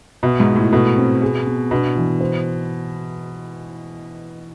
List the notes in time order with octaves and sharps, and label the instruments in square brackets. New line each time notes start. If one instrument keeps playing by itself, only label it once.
[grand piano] B2 [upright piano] E5
[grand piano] G#2
[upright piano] F4
[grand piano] A2
[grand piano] B2 [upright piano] A4
[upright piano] C4
G#4
B3
[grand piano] B2 [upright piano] D4
[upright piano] E3
C5